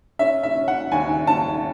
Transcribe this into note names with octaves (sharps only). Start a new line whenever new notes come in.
C#4 E5
E5
C#4
F#5
D#2 G#5
C#4 A5